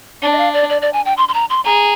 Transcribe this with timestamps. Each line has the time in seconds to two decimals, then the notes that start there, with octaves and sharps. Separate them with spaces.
0.22 D4 D5
0.32 D#5
0.38 F5
0.54 D5
0.70 D5
0.82 D5
0.93 G#5
1.05 G5
1.17 C6
1.29 C6
1.34 A#5
1.50 C6
1.65 G#4 A#5